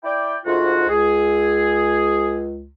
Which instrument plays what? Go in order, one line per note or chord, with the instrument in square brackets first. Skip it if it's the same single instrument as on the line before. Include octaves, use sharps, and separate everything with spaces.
[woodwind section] E4 D5 G5
[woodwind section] D2 G#2 F#4 [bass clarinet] F4
[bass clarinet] C#2 [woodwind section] G#4